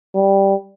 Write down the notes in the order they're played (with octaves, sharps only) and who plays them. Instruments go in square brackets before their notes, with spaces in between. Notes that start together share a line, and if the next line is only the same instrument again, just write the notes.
[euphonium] G3